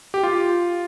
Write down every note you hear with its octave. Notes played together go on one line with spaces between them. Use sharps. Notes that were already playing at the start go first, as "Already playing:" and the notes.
G4
F4